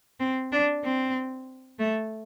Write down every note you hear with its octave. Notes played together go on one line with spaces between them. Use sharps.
C4
D4
C4
A3